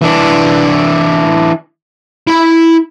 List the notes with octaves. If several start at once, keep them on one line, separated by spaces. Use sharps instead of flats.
E3 D4
E4 B5